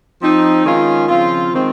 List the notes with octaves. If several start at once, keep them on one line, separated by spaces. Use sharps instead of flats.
F3 C4 D#4
D#3 G#3 C#4 F4
C#3 F3 C4 F4
D#3 G#3 C4